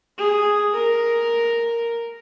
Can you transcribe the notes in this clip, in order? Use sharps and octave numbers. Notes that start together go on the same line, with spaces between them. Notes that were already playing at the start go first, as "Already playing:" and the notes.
G#4
A#4